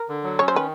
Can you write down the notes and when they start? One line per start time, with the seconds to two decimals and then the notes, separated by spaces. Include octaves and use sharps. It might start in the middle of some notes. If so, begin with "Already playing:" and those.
Already playing: A#4
0.09 D3
0.24 F#3
0.39 C#4 C#5
0.48 C5
0.54 D#3 B4